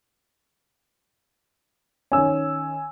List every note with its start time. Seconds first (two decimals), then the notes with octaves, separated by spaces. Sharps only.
2.12 D#3 C#4 G#5 E6